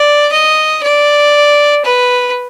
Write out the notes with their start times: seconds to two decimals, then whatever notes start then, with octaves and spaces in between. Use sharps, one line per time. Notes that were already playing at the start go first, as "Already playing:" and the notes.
Already playing: D5
0.32 D#5
0.83 D5
1.85 B4